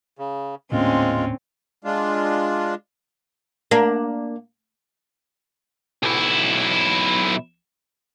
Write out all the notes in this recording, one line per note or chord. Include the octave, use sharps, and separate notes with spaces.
C#3
D#1 A2 D3 G#3 A#3 C4 C#4 F4
G#3 D4 F4
A#3 D4
B1 E4